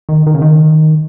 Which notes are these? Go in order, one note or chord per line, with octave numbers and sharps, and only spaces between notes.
D#3
D#3
C#3
D#3